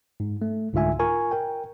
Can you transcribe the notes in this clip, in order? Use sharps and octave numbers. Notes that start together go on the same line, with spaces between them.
G#2
A3
C2 G#2 D3 F4 E5 G#5
F4 A#4 G#5 C#6
A#4 G5